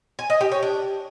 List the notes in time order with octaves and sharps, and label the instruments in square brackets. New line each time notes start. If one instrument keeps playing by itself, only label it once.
[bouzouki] G#5
D#5
G4
C#5
D4